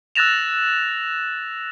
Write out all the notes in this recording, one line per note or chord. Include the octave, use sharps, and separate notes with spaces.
E6 F#6 A6 A#6 E7 F7